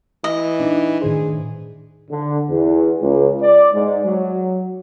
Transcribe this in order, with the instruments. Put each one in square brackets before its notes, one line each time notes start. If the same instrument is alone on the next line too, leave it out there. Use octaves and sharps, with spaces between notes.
[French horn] E3 [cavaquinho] D#5
[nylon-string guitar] D4 D#4
[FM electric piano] A2 D#3 C5 [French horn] G#4
[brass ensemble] D3
E2
C#2
D5
G#2
F#3